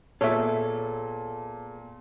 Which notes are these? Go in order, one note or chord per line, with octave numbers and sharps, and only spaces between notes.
A#2 B3 G#4 A4 C#5 E5